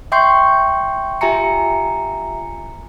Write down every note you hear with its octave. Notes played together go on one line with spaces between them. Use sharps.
E5 G5 C6 C#6 G6 C7
F4 G4 E5 G#5 A#5 C#7